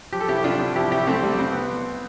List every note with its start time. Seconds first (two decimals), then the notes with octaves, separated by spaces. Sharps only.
0.12 F3 G4
0.20 A4
0.28 C2 E4 G4
0.44 C3 D4 F4
0.60 C2
0.76 F3 E4 G4
0.91 C2 E4 G4
1.07 C3 A3 C4
1.23 C2 G3
1.39 F2 C4
1.52 B3